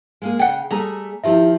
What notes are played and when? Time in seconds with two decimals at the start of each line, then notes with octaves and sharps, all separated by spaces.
0.22 G#3 A#3 G#4
0.39 C#3 F#5 G5
0.71 G3 A3 G#4 A#5
1.24 D#3 F3 C4 E4 G4 E5